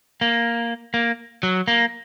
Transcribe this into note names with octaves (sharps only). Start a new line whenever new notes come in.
A#3
A#3
F#3
A#3